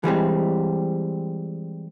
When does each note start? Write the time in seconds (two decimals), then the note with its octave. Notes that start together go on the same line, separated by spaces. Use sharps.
0.04 E3 G3 G#3 C4